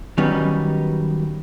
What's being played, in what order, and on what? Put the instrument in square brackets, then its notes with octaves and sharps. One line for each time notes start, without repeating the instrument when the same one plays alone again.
[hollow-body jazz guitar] D#3 F#3 G3 B3 C#4 D#4